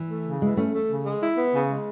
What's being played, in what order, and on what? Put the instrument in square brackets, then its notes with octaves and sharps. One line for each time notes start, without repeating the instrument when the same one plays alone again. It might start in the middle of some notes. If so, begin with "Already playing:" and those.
Already playing: [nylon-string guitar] E3
[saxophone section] A3
C#3
[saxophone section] E3 [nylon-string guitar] G#3
[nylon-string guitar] A3 [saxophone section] C#4
[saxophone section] A3
C#3
G#3
E4
B3
C#3
G#3